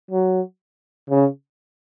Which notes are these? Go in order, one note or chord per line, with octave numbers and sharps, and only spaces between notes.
F#3
C#3